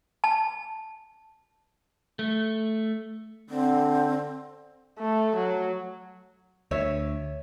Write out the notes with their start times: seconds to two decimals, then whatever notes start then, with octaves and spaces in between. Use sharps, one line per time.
0.24 A5
2.19 A3
3.50 D3 C4
4.99 A3
5.36 F#3
6.71 D2 C#5 E5